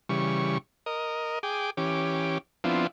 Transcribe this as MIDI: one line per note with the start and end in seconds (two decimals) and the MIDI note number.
0.09 0.58 49
0.09 0.58 52
0.09 0.58 55
0.09 0.58 85
0.86 1.39 70
0.86 1.39 75
1.43 1.70 68
1.43 1.70 79
1.43 1.70 86
1.77 2.38 52
1.77 2.38 61
1.77 2.38 67
1.77 2.38 86
2.64 2.87 53
2.64 2.87 59
2.64 2.87 60
2.64 2.87 62
2.64 2.87 64
2.64 2.87 65